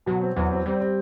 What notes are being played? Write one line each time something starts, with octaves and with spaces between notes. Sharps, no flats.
B2 F#3
C4
E2 F#3
C4
G3 C4
C4